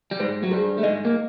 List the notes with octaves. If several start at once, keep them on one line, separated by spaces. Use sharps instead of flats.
G3
G#2 G#3 C5
F#3
G2 G3 G#4
A3
G#2 G#3 D#5
A#3